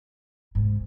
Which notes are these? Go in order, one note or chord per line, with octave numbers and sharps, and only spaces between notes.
G#2